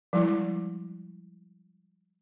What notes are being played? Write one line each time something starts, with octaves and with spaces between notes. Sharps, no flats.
F3 G3 G#3 E4